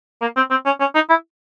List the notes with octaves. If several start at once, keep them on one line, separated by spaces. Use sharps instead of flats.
A#3
C4
C4
C#4
C#4
D#4
E4